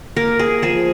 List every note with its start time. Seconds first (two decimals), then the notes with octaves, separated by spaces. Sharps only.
0.16 A#3 A#4
0.39 G#4
0.62 F3 G#4